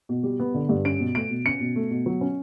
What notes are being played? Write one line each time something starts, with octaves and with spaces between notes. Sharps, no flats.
B2
G3
B3
D3
G2
C#4 D7
B2
A3 D7
B2
C#4 C#7
B2
A3
B2
F#3
C#4